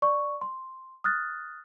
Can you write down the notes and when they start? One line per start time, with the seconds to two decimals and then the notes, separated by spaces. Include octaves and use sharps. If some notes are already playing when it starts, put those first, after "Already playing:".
0.02 D5 C#6
0.41 C6
1.04 D#6 F6 F#6 A6